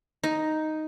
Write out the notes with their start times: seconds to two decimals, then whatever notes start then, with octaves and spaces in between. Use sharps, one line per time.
0.23 D#4